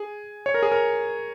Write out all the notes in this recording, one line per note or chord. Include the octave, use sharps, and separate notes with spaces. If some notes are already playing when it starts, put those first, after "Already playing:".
Already playing: G#4
C#5
A#4
G#4
A#4